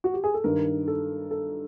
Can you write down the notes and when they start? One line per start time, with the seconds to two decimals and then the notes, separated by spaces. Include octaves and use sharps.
0.04 F#4
0.14 G4
0.24 G#4
0.34 A4
0.44 G2 D#3 A#4
0.88 A4
1.31 A4